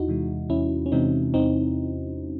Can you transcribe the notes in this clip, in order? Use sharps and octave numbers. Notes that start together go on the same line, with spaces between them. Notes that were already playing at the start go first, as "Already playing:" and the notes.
Already playing: E2 D#4 E4 F#4
C3 E3 G#3
E2 C#4 E4
C#4
C3 E3 G#3 C4 D#4
E2 C4 D#4